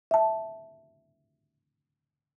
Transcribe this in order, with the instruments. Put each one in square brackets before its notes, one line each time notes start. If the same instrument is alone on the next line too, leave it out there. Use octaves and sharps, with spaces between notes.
[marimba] E5 A5